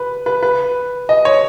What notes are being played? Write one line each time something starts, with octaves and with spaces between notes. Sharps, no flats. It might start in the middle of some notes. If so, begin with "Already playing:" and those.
Already playing: B4
B4
B4
D#5
C#5